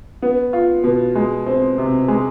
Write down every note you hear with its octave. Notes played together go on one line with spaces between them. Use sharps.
B3
F4
B2
G#3
C4
C3
G#3